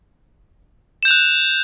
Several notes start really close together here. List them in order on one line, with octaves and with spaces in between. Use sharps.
E7 G6 F7 F#6